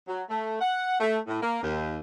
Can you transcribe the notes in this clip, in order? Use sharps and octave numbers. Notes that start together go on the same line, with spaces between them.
F#3
A3
F#5
A3
A2
A#3
D#2